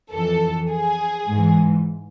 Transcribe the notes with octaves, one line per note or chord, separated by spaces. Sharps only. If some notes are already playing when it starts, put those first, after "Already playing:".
F2 E3 A4
G#4
G#2 E3